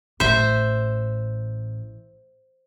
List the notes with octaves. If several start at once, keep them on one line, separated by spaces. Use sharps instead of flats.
A1 C5 E5